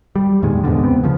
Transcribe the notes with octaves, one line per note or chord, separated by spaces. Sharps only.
G3
E2 A#2 D#3 G#3
E2 G#2 B2 D3
C#2 B3 C4
C#3 F3